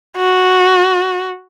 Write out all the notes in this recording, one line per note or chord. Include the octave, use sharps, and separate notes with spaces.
F#4